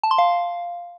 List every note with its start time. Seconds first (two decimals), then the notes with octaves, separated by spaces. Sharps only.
0.03 A5
0.11 C6
0.18 F5